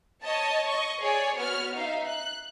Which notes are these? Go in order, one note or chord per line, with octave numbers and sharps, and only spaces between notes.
C#5 D#5 A5
D#5 C#6
G#4 C#5 D5 G#5
B3 F#4 C#5 F6
D#4 E5 F5
F#6